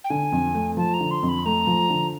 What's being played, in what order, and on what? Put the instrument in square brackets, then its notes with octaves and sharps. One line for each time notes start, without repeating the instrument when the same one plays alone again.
[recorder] G5
[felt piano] D3 [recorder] G#5
[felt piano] F2
A3
[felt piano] F3 [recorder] A5
[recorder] A#5
[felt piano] D3
[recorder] C6
[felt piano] F2
[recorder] B5
[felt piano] A3 [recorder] A#5
[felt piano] F3
D3